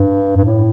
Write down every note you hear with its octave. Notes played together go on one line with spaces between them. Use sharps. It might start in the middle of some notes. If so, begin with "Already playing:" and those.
Already playing: G2
G2
A2